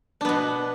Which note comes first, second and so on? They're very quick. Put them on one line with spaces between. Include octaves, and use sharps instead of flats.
D4 B3 B2